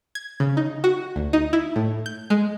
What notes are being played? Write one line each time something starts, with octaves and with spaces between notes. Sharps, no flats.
G#6
C#3
D#4
F#4
D2
D#4
E4
A2
G6
G#3